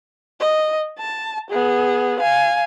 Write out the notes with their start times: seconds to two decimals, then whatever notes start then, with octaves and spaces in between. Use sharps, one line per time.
0.40 D#5
0.99 A5
1.50 B3 G#4
2.20 F5 G#5